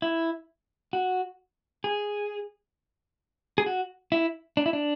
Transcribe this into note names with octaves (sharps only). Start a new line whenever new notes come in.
E4
F#4
G#4
G#4
F#4
E4
D4
E4
D4